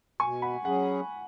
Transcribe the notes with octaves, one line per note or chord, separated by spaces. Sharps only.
B2 G#5 C#6
F#5 B5
F#3 C#4 G#4 F#5